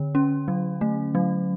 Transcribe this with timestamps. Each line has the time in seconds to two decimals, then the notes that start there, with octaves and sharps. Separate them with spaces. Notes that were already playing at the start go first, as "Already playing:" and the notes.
Already playing: D3
0.15 C#4
0.48 F#3
0.81 A3
1.15 F#3